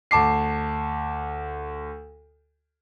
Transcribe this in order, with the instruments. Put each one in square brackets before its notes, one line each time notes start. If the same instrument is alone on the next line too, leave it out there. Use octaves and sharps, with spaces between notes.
[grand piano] D2 A5 D6 C7